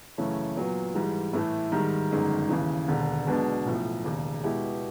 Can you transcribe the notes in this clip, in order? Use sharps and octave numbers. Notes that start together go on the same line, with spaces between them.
F#2 C#3 E3 A3 C#4
A#2 F#3 B3
G#2 E3 G3
A2 E3 A3
G#2 D#3 G3
G1 F#2 D#3 G#3
D#2 C#3 E3
E1 D#2 D3
B1 B2 G#3 B3 D4
B1 A2 F3
E1 D#2 C#3
B2 G#3 B3 E4 G4